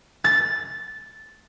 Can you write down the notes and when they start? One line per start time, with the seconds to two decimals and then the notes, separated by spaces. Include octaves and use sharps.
0.24 A6